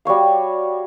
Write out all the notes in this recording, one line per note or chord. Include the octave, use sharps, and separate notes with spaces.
G3 F#4 C#5 F5